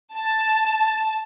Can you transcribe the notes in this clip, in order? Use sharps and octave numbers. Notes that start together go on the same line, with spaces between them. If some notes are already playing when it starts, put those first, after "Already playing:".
A5